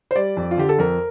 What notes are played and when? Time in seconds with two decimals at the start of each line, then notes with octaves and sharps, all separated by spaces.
0.11 C5
0.15 G3 D5
0.37 F2
0.51 F4
0.57 D3 G4
0.69 A4
0.78 F2 A#4